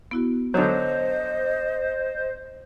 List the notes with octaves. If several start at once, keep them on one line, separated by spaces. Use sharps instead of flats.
B3 E4 F#4
D3 F#3 C5 D#5 C#6 D#6 A6